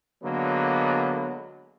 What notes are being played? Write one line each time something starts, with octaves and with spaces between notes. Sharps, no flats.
D3 F#3 G#3 A#3 B3